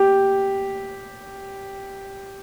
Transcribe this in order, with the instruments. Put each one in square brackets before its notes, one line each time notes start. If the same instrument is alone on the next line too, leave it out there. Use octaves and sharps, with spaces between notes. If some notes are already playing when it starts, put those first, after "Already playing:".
Already playing: [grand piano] G4